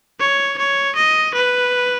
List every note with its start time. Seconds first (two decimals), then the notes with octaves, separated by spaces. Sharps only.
0.20 C#5
0.58 C#5
0.96 D#5
1.35 B4